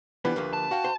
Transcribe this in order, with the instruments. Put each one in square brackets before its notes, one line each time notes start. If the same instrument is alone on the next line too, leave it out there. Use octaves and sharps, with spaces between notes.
[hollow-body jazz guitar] E3 F3 B3 [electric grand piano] D4 G4 B4
[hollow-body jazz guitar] D2 F3 A#3
[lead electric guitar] A5
[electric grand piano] F#4 F5 G5
[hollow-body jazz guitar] C5